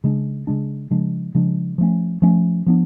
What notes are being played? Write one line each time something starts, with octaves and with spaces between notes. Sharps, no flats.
C#3 G#3 D4
C#3 G#3 D4
C#3 F3 G#3 D4
C#3 F3 G#3 D4
F3 A3 C#4
F3 A3 C#4
F3 B3 D4